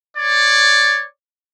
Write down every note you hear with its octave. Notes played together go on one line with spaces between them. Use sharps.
C#5 D5